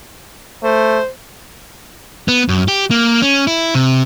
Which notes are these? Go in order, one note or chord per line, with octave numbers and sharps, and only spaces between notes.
A3 C5
B3
F#2
G4
A#3
C#4
E4
C3